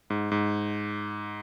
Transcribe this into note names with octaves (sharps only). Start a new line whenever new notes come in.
G#2
G#2